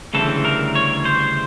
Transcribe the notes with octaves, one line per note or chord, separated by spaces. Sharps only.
D2 C#3 E3 G3 C4 A4
A#4
C#5
C5